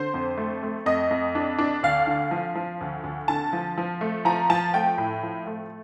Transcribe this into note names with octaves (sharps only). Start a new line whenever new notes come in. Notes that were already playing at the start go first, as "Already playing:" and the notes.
Already playing: D3 C5
F2
A3
A3
F2 D#5
F2
D4
D4
D2 F5
D3
F3
F3
D2
D2
D3 A5
F3
F3
A3
F3 A#5
F3 A5
A3 G5
A2
F3
A3